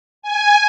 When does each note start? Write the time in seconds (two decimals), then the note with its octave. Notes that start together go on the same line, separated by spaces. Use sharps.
0.22 G#5